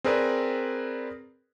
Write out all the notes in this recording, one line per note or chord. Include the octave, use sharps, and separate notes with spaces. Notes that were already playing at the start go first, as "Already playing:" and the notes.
C4 G#4 A#4 B4 D5